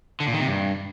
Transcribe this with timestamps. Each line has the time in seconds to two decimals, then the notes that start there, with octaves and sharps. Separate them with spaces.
0.20 D3
0.27 A#2
0.34 D#3
0.40 C3
0.47 G2